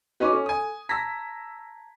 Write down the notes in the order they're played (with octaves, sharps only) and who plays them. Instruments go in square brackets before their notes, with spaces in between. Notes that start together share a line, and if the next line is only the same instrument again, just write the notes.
[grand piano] C#4 D#4 B4 [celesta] F#4 C#6 D6
[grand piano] C#4 [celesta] A4
[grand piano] G#5 D#6
[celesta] A5 A#5 G#6 [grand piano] E6 A#6 B6